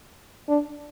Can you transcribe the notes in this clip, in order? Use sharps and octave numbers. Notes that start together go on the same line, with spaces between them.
D4